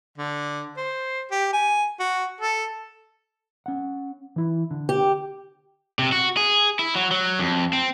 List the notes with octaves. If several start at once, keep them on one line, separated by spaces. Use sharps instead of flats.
D3
C5
G4
G#5
F#4
A4
C#4 F#5
E3 E4
D3
G4
C3
F#4
G#4
E4
F#3
F#3
F2
C4